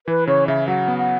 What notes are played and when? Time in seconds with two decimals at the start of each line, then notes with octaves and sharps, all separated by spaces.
0.07 E3 B4
0.27 C#3 C#5
0.47 C#3 E5
0.68 F#3 F#5
0.88 B3
0.98 F#5